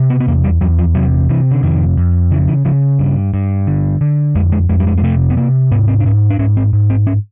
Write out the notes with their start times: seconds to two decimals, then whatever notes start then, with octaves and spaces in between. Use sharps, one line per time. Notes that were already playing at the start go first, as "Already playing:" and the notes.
Already playing: C3
0.10 B3
0.20 B3
0.27 E2 A#3
0.44 G3
0.61 E2 F#3
0.78 F3
0.95 C3 F#3
1.29 C3 E3
1.51 D3
1.63 F2 D#3
1.97 F2
2.31 C#3 E3
2.48 E3
2.65 C#3 F3
2.99 G2
3.34 G2
3.67 D3
4.01 D3
4.35 F2 G#3
4.52 G#3
4.69 F2 G#3
4.80 G3
4.87 G#3
4.98 G#3
5.03 C3 A3
5.30 B3
5.37 C3 A#3
5.71 G#2 B3
5.88 C4
6.00 D4
6.05 G#2 C#4
6.30 D4
6.39 G#2 C#4
6.57 C4
6.73 G#2
6.90 C4
7.07 C#4